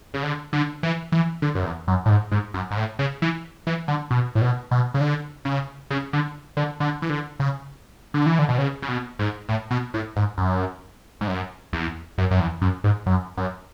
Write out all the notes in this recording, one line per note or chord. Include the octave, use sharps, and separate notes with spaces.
C#3
D3
D3
E3
E3
D3
F#2
E2
F#2
A2
G#2
G#2
F#2
G#2
A2
C#3
E3
E3
D3
B2
A2
B2
B2
C#3
D3
C#3
C#3
D3
D3
D3
E3
D3
C#3
D3
E3
D3
B2
C#3
C#3
B2
G#2
A2
B2
A2
G#2
F#2
G#2
F#2
E2
F#2
F#2
E2
F#2
G#2
F#2
F#2